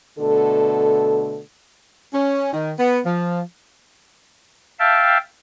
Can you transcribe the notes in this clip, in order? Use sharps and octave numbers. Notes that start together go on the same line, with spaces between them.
B2 D3 A3 A4
C#4
D#3
B3
F3
E5 F5 G5 A5